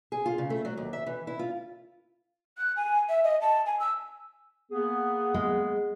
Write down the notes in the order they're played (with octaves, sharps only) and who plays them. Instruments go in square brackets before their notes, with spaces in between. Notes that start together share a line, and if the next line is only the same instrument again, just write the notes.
[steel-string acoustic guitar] G#4
F4
C#3
A3
F#3
D#2
E5
E3
E4
F4
[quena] F#6
G#5
E5
D#5
A5
G#5
E6
[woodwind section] A#3 B3 G#4
[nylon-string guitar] G#3